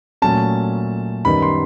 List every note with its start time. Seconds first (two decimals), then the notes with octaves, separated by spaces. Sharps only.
0.22 A#2 F#3 A3 C#4 A5
1.25 F#2 D#3 G3 B3 D#4 B5
1.42 C6